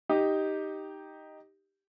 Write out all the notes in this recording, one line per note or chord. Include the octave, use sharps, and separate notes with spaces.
D#4 G4 D#6